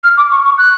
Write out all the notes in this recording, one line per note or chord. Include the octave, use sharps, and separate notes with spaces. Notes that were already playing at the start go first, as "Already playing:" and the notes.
F6
D6
C#6
C#6
F#6